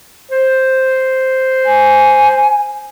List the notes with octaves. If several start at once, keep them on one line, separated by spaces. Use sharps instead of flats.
C5
G#5